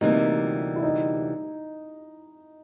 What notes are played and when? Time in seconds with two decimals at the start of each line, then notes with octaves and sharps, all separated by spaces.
0.01 D2 C3 E3 G3 A#3 D#4
0.76 E4
0.83 D#4